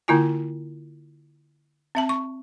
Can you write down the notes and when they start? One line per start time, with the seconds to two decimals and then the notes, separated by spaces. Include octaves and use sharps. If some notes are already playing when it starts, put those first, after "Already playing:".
0.08 D3 A#3 E4 F4 G#5
1.95 C4 E5 A5
2.09 C#6